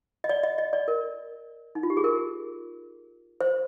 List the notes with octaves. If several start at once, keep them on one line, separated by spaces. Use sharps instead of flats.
D#5
D5
D#5
D#5
D5
A#4
D#4
F4
G4
G#4
A#4
C5